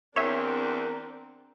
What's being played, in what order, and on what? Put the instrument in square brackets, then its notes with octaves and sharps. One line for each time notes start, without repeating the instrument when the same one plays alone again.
[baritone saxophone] E2 [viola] C4 D4 [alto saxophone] A#4 [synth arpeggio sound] C#5 E5